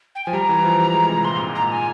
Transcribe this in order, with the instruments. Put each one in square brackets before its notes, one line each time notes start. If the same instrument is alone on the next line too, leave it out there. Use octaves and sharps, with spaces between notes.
[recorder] G5
[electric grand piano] F3 [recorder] G#5
[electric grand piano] G3 [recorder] A#5
[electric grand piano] E3
F3
G3
G#3
C3
[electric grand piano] A#2 [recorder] C6
[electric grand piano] G#2
A#2
[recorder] A#5
G#5